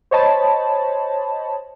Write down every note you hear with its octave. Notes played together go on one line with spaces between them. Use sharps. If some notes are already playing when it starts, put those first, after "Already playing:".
C5 C#5 D#5 A5 B5